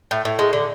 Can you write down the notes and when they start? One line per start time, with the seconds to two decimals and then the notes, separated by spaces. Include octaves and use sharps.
0.11 A2
0.25 A2
0.39 G#3
0.53 D3